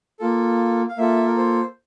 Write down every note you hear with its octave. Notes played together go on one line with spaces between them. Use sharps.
A#3 F4 A4
F5
A#3 F4 A4 E5
A#4
C5